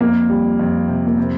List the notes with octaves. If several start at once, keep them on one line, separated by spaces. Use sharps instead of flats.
F2 A#3
G3
F2
C3
A#3
C3 C4